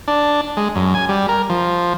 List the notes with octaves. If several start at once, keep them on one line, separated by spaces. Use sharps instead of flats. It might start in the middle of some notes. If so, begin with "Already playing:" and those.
D4
G#3
F#2
G#5
G3
A#4
F3